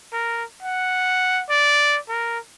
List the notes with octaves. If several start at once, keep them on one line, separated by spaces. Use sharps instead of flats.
A#4
F#5
D5
A#4